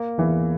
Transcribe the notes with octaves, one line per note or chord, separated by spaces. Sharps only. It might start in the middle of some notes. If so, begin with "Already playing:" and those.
Already playing: A#3
E2 E3